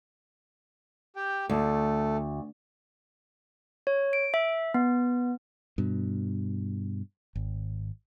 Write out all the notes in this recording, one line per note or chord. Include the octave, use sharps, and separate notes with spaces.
G4 G5
D2 A3
C#5
D7
E5
B3
G2 B2
G#1